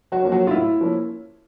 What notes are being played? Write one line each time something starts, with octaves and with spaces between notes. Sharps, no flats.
F#3 F#4
F3 A#3 C#4
F#3 F#4
F4
A2 E4
F3 A#3 C#4